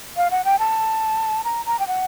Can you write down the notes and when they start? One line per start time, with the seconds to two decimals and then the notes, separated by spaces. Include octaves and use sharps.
0.17 F5
0.31 F#5
0.45 G5
0.59 A5
1.44 A#5
1.66 A#5
1.79 G5
1.87 F#5